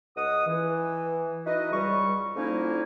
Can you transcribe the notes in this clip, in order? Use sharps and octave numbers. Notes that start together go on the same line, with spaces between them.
C#2 D#5 F#5 D#6
E3
D#4 E4 F#4 B4 D#5
C#2 G3 C#6
D3 F3 A#3 C#4 D#4 E4